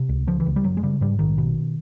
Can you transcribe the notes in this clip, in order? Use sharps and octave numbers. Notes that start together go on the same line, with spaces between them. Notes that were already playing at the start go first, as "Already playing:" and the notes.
Already playing: C3
C#2
C#3 F3
E3
C#2
G3
F#1 F#3
G#3
C#3 G3
G#2 G3
A#1 D#3
B2